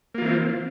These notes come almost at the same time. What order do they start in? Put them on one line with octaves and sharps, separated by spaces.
A#3 F4 E3 C4